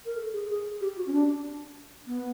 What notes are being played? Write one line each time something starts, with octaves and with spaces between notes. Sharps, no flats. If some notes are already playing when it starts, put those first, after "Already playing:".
A#4
A4
G#4
G#4
G4
F#4
C#4
D4
B3